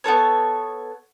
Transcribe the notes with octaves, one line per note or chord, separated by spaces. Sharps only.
B3 C#4 A4 C#5